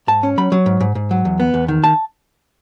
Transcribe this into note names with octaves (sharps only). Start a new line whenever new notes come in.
G#2 A5
C#4
F#3 B5
F#3
G#2
G#2
G#2
F#3
E2
B3
E2
D#3
A5